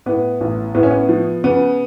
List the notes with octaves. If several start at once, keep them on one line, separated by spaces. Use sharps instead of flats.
A2 B3
A1
A2 B3
C#4
B3
F3
C#3 B3